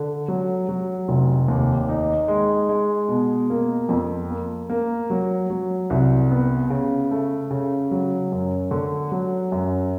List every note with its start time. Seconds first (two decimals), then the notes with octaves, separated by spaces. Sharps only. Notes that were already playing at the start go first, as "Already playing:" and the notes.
Already playing: D3
0.28 F#3
0.69 F#3
1.08 F1
1.48 D#2
1.89 D#4
2.28 G#3
2.69 G#3
3.09 B2
3.50 A#3
3.89 F2
4.30 A#3
4.70 A#3
5.10 F#3
5.50 F#3
5.90 C2
6.31 B3
6.70 C#3
7.11 A3
7.51 C#3
7.91 F#3
8.32 F#2
8.71 D3
9.12 F#3
9.52 F#2